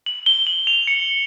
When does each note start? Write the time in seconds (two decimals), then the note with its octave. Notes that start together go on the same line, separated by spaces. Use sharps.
0.06 F#7
0.26 G7
0.47 F#7
0.67 F7
0.87 C#7